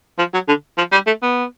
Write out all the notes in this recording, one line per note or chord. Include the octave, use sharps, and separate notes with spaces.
F3
F#3
D3
F3
G3
A3
B3